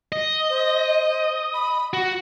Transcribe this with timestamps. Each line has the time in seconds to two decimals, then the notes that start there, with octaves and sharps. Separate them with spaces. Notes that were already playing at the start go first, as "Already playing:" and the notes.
0.12 D#5
0.50 C5
1.54 B5
1.93 F#4 F#5